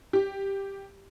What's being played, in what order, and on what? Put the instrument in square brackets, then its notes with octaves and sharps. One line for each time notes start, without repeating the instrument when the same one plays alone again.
[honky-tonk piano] G4